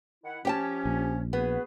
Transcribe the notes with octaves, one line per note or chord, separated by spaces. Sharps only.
D#3 E4 F#5
F3 C#4 G4 G5 A5
A#1
B3 F#4 G#4 B4